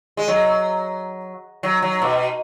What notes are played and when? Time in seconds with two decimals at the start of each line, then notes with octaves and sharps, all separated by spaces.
0.17 G#3
0.28 F#3
1.63 F#3
1.82 F#3
2.02 B2